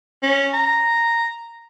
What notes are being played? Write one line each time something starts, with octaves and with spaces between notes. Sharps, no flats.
C#4
A#5